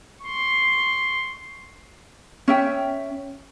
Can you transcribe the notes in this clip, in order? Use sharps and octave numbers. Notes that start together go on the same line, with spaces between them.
C6 C#6
C#4 E5 G5